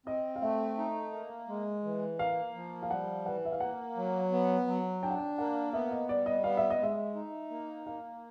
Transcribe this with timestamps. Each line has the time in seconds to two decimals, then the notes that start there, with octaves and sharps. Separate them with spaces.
0.06 C4 D#5
0.36 F5
0.41 A3 E5
0.78 D#4
1.12 A#3
1.48 G#3
1.84 E3
2.19 A#3 F5
2.55 F3
2.83 F5
2.90 G3 F#5
3.25 E3 F#5
3.45 E5
3.52 F5
3.60 A#3 F#5
3.96 F#3
4.32 B3
4.67 F#3
5.03 D4 G5
5.10 F#5
5.18 G5
5.38 A#3 F#5
5.73 B3 E5
5.91 D#5
6.09 G3 D5
6.26 D#5
6.44 B3 F5
6.57 E5
6.70 D#5
6.80 G#3 E5
7.15 D#4
7.50 A#3
7.86 A#3 F5